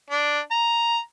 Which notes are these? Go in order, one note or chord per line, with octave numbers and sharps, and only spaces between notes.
D4
A#5